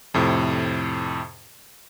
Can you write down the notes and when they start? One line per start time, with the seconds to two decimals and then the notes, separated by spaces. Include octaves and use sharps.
0.14 F2 A2 C3